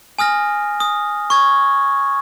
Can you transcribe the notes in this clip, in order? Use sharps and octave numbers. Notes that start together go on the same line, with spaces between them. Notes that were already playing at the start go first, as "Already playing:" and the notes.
G#5 D#6 F6 A#6
D#6
C#6 G#6